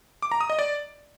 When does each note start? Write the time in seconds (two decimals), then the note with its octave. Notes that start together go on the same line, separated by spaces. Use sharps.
0.22 D6
0.32 A#5
0.41 D#6
0.50 D#5
0.59 D5